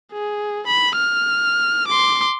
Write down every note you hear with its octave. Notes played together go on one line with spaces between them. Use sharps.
G#4
B5
F6
C6 D6